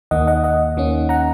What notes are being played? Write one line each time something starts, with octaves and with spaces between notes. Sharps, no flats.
D#2 D#3 A#3 D#5 F#5
D#5 F#5
D#5 F#5
D#2 D#3 A#3 C#4
F#5 A#5